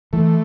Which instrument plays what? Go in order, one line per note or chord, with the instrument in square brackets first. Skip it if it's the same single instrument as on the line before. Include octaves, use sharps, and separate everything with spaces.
[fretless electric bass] E3 [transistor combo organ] A3